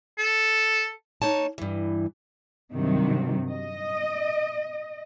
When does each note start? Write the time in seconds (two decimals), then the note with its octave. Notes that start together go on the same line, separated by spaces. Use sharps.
0.18 A4
1.22 A#3 D#4 C#5 A5
1.58 G2 E3
2.74 G2 C3 D#3 F#3
3.50 D#5